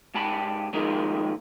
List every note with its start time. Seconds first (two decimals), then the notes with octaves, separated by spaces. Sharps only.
0.14 G#2 G4 A5 B5
0.73 D#2 F3 G#3 D#4 A#4